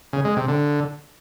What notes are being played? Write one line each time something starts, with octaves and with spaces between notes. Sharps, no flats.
C#3
G#3
C3
D3